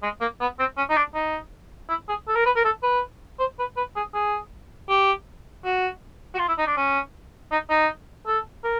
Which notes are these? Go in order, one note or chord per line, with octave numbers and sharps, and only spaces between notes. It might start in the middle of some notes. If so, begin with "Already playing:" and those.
G#3
A#3
B3
C4
C#4
D#4
D4
D#4
E4
G#4
A4
A#4
B4
A#4
A4
B4
C5
B4
B4
G#4
G#4
G4
F#4
F#4
F4
E4
D#4
D4
C#4
D#4
D#4
A4
A#4